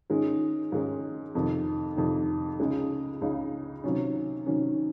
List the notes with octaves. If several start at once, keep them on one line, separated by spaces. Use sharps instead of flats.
G#2 D#3 G#3 C#4
G#2 D#3 G#3 C#4
F2 C3 D#3
F2 C3 D#3
C#2 C#3 G#3 D#4
C#2 C#3 G#3 D#4
C3 D#3 F#3 C#4
C3 D#3 F#3 C#4